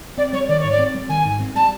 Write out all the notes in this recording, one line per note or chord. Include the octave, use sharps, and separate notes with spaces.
C4 D5
G3 C#5
D#3 D5
G#2 C#5
D5
C4
G3
D#3 G#5
G#2
C4
G3 A5